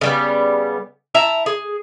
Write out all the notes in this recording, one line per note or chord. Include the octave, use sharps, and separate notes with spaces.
C#3 G3 B3
E4 E5 A5 A#5
G#4